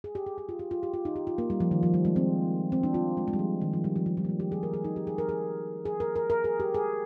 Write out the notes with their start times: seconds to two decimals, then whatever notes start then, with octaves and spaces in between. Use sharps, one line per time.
0.04 G#4
0.15 G4
0.26 G#4
0.38 G4
0.49 F4
0.59 G4
0.71 F4
0.83 G4
0.94 F4
1.05 D#4
1.16 G4
1.27 F4
1.38 A#3
1.50 G3
1.60 F3
1.71 D#3
1.83 F3
1.94 G3
2.05 G#3
2.16 C4
2.72 C4
2.83 D4
2.94 F4
3.17 G#3
3.28 G#3
3.33 G3
3.39 F3
3.61 D#3
3.73 F3
3.84 G3
3.96 F3
4.06 F3
4.17 G3
4.24 A#3
4.29 G#3
4.40 G4
4.52 G#4
4.63 A#4
4.73 G#4
4.84 D#4
4.96 G4
5.07 G#4
5.18 A#4
5.29 G#4
5.85 G#4
6.00 A#4
6.16 A#4
6.30 A#4
6.44 G#4
6.60 G4
6.74 G#4